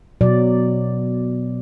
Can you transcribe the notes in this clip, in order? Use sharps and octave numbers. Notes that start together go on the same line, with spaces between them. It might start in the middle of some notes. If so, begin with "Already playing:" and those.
B2 F#3 D5